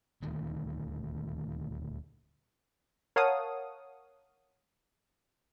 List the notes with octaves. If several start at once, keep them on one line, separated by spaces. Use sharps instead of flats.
D#1 D2 D#3
A#4 C#5 F5 F#5 A5 D#6